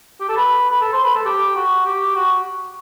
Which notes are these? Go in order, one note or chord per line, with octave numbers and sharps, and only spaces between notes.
G4
A4
B4
B4
A4
C5
B4
A4
G4
F#4
G4
F#4